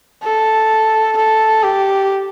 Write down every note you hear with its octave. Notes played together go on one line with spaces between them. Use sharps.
A4
A4
G4